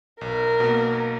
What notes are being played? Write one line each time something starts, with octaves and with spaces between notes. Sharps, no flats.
B1 A#4
B2 A#3